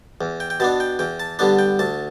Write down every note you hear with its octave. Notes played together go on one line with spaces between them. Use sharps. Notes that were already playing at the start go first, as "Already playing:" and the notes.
E2
G5
G5
B2 B3 D4 A5
G5
E2 G5
A5
D3 G3 B3 D4 A5
G5
D2 A5